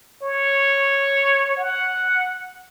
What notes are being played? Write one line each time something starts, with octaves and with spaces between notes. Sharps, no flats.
C#5
F#5